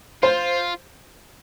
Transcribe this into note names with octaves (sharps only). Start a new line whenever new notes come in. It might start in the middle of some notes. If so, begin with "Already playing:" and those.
F4 C5